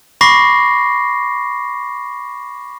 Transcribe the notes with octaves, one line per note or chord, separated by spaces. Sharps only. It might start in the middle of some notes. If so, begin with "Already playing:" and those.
B5 C#6 D6 A#6 C7